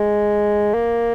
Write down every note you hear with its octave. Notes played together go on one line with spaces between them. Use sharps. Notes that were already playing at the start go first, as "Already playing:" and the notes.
Already playing: G#3
A#3